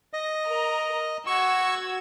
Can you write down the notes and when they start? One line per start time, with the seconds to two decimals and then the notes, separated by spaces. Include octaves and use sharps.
0.13 D#5 A#6
0.47 A#4 A#5
1.27 F#4 C#6 E6 G#6